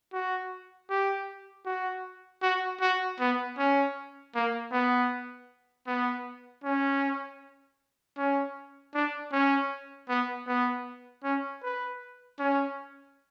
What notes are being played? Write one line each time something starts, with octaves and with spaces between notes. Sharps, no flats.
F#4
G4
F#4
F#4
F#4
B3
C#4
A#3
B3
B3
C#4
C#4
D4
C#4
B3
B3
C#4
B4
C#4